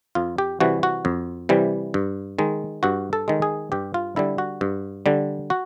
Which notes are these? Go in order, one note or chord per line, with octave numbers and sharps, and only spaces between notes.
F2 F4
G4
C3 E3 G3 F#4
F#4
F2
C3 E3 G3
G2
D#3 G#3
G2 F#4
A4
D#3 G#3
G#4
G2 G4
F4
D3 G3 E4
F#4
G2
D3 G3
F#4